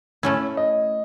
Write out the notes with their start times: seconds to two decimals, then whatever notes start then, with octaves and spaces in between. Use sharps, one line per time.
0.23 A3 C#4 E4
0.57 D#5